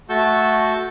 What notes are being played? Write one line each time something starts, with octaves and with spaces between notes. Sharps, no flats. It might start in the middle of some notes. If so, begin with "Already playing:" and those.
A3 F#4 A5 C#6 E6 G6